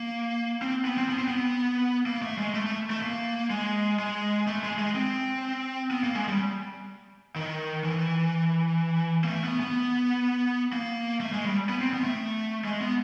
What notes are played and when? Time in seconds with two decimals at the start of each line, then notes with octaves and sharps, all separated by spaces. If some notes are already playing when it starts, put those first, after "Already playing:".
Already playing: A#3
0.62 C4
0.85 B3
0.98 C4
1.09 B3
1.19 C4
1.28 B3
2.06 A#3
2.22 A3
2.38 G#3
2.54 A3
2.66 A3
2.90 A3
3.02 A#3
3.50 G#3
3.99 G#3
4.47 A3
4.63 G#3
4.78 G#3
4.95 C4
5.91 B3
6.04 A#3
6.15 G#3
6.28 G3
7.36 D#3
7.84 E3
9.24 A#3
9.28 A3
9.44 B3
9.60 B3
10.73 A#3
11.20 A3
11.33 G#3
11.45 G3
11.69 B3
11.81 C4
11.93 B3
12.04 A3
12.64 G#3
12.81 B3